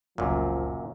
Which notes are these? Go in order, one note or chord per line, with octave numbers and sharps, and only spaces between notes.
F1 C#2 F#2 A#2 F3